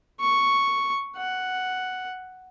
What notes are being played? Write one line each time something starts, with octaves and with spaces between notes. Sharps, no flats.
C#6
F#5